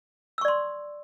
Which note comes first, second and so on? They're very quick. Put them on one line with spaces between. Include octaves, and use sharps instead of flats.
E6 C#6 D5 C6